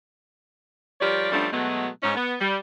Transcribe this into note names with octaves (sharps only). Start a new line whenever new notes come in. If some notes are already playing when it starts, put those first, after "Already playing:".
F3 G3 G4 A#4 C#5 D5
F3 G3 A3 B3 C#4 D4
B2 F#3 G#3 A3 B3
G#2 C#4 D#4
B3
G3